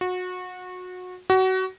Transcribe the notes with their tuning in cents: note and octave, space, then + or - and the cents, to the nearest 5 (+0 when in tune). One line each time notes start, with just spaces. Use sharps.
F#4 -25
F#4 +25